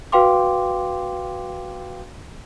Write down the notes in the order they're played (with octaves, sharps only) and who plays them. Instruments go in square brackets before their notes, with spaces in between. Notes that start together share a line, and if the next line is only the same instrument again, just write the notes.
[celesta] F#4 B4 F5 G5 C6 D6